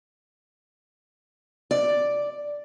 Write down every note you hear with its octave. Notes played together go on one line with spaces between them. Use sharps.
D5